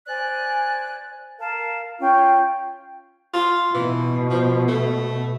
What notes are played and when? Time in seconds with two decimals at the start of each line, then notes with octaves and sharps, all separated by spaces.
0.06 C5 D5 G#5 F#6
1.39 A#4 F5 A5
2.00 C#4 F4 G5
3.34 F4
3.74 B2 E3
4.30 F3
4.68 A3